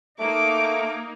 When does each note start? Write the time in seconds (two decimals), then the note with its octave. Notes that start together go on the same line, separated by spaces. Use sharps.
0.19 A3 A#3 D#4 D6